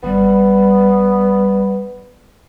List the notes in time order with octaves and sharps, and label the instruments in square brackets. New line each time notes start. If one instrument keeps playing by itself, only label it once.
[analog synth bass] G#1 [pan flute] G3 [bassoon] B3